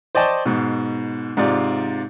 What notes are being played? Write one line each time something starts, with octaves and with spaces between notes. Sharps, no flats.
C5 D5 D#5 G5 A5 C#6
G#2 B2
G#2 C3 F4 D5